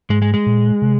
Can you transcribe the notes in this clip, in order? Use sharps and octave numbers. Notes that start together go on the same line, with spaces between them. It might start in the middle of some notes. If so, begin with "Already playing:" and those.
G#2 G#3
G#3
G#3
A#2
C3